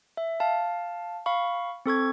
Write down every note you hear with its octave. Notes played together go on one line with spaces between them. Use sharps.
E5
F5 A5
F5 B5 C#6
C4 A4 C#6 G#6